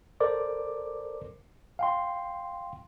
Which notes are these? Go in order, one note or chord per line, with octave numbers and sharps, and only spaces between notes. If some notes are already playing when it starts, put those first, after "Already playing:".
A4 A#4 C5 D5 D6
F5 G5 C6